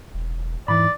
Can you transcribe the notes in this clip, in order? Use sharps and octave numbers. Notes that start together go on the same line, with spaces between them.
E1
E2 G#2 E3 D5 B5